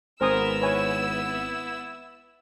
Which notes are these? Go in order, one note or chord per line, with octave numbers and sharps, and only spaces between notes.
G#1 B3 A#4 C5 G#5 D#6 E6
E4 B4 C#5 G#5